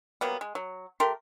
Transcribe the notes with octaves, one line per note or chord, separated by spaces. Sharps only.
F#3 G3 A#3 B3
G#3
F#3
A3 G4 A#4 C6